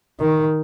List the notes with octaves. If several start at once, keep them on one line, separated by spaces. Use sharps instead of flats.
D#3